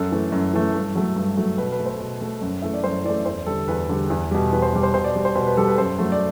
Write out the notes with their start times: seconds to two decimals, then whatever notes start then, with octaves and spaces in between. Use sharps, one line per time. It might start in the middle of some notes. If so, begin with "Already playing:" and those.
Already playing: F#2 A4
0.12 E3 A3
0.32 F#2
0.53 E3 A3
0.74 G2
0.95 F#3 A3
1.16 G2
1.37 F#3 A3
1.58 B2 B4
1.72 B4
1.79 A3
1.86 C5
2.00 B2
2.21 A3
2.42 F#2
2.62 E3 A3 E5
2.74 D5
2.84 F#2 C5
3.04 E3 A3 D5
3.25 E2 C5
3.46 D3 G3 A4
3.68 E2 B4
3.89 D3 G3
4.10 E2
4.31 B2 G3
4.52 E2 B4
4.62 C5
4.73 B2 G3
4.83 C5
4.94 B2 C5
5.04 D5
5.16 G3
5.25 C5
5.35 B2 C5
5.47 B4
5.57 G3 A4
5.68 B4
5.78 F#2 C5
5.99 F#3 A3
6.12 D5